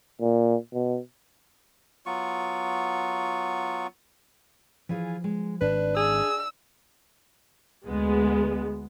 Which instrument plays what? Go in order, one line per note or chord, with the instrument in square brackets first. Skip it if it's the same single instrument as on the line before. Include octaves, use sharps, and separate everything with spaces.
[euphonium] A#2
B2
[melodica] F#3 B3 F4 C#6
[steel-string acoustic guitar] E3 F4 G#4 [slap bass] F3
[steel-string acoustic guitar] G#3
[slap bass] G#1 [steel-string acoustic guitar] D4 [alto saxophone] B4
[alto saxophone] G#4 [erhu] E6
[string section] D2 G#3 B3